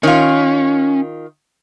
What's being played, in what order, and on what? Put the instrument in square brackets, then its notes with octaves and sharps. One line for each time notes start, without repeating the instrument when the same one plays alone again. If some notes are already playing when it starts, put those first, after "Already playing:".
[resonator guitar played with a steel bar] D#3 F4 [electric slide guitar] C#4